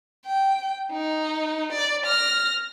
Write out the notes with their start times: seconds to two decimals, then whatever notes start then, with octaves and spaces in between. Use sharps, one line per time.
0.26 G5
0.92 D#4
1.73 D5
2.06 F6 A#6